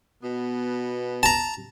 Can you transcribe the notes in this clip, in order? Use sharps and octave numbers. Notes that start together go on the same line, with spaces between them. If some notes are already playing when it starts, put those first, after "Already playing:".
B2 B3
A5 A#5